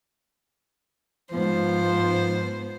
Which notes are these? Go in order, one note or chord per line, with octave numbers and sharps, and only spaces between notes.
G#2 F3 B3 C5